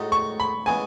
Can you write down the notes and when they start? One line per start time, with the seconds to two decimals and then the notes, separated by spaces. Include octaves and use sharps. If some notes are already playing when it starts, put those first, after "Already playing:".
Already playing: A2 G#3 D#4 F#4
0.12 C#6
0.40 B5
0.66 C#3 E3 G#3 B3 G#5